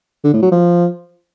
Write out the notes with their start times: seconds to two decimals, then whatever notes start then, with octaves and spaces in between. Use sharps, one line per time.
0.24 D3
0.33 A2
0.43 F#3
0.52 F3